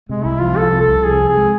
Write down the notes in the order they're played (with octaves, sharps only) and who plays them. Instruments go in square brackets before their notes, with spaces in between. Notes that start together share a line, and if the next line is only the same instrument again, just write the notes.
[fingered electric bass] C3 [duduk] G#3
[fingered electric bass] C2 [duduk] E4
[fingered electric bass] F3 [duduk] F4
[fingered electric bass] C2 [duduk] A4
[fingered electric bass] C3
[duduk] A4
[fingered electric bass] C2
[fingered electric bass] F3 [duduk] G#4
[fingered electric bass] C3
[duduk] G#4
[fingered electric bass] G#3